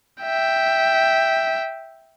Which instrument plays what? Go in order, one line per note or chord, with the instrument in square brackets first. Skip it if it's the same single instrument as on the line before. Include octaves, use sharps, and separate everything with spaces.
[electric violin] E5 G5